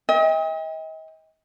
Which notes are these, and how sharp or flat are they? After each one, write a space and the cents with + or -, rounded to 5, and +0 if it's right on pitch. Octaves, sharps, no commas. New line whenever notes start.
D#5 +40 G5 +35